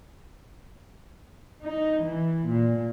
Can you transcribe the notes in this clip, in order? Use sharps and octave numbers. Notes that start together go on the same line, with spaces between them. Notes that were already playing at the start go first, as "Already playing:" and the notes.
D#4
E3
A#2